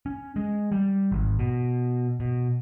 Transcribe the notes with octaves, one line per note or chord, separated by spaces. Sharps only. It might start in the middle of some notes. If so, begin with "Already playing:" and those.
C#4
G#3
G3
G#1
B2
B2